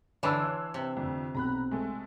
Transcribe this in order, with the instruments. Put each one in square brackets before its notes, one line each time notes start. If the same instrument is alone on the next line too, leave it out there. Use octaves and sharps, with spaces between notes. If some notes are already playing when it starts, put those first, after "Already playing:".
[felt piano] D3 B5 E7 [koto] E3 D4 [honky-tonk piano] C#5 C6 E6
[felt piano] F#6
[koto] C3
[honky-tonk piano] F2 [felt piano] D3
[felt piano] B1 C4 [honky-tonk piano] A#5 B5 F#6
[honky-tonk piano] G#3 A3 A4